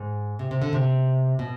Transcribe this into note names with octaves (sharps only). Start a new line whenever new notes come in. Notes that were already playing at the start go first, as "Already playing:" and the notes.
Already playing: G#2
C3
C3
D3
C3
B2